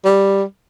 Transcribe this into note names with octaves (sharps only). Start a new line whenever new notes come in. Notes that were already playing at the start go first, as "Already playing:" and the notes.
G3